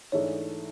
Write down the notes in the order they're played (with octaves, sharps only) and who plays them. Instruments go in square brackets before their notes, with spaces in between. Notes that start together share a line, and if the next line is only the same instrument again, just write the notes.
[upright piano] G#2 E3 A3 D4 G#4 [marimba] C#5